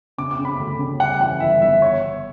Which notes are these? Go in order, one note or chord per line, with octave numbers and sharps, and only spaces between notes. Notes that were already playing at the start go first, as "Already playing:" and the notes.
C#3 D6
D6
C#3
B5
D2
C#3
G3 F#5
E3 F#5
G1 E5
G1 E5
C#5